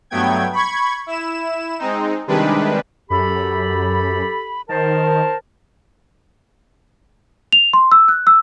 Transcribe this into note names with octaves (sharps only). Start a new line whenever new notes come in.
G2 F#3 A3 B3 G5 G#6
B5 C#6 G#6
E4 E7
G#3 C4 D#4
C3 D#3 G3 G#3 D4 B4
F#2 G4 A4 B5
D#3 A#4 C5 A5
F7
C6
E6
F#6
E6